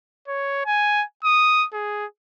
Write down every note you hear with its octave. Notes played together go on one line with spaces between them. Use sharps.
C#5
G#5
D#6
G#4